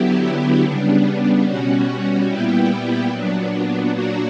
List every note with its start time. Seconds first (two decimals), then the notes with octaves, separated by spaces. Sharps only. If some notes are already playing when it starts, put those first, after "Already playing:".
Already playing: D3 F#3 B3 E4 G4
0.63 C#3 G3 B3 D4
1.45 B2 G3 C#4 F#4
2.28 A#2 G3 B3 E4 G4
3.10 A#2 F#3 B3 D4
3.92 A#2 F#3 A#3 D4 F#4